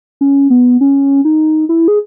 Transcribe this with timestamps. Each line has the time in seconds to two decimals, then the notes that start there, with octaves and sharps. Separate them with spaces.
0.21 C#4
0.50 B3
0.81 C#4
1.25 D#4
1.69 E4
1.88 G#4